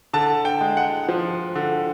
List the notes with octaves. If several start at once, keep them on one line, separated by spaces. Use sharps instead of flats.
D3 A5
G5
G#3
F#5
F3
D3